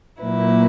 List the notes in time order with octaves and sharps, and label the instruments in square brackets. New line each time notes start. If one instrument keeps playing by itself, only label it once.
[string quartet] A#2 F#3 A#3 E4 B4